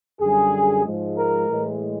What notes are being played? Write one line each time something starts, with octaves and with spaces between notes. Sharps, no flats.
F#2 D3 G3 G#4
G#2 F3 G#3
A#4
A2 E3 G#3